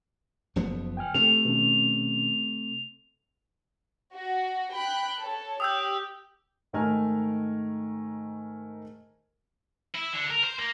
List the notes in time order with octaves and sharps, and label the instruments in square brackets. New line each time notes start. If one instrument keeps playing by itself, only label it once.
[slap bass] F#1 F3 B3
[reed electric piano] G5 G#5 F6
[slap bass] C3 A3 [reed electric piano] A4 [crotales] F7
[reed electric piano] B2 D#3 C#4
[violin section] F#4
G5 B5 F#6
A4 C#5
[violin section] G4 [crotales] D#6 E6 G6
[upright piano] G#2 D#3 A3 A#4 G#5 F6
[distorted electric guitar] E4
D3
A#4
C5
A#3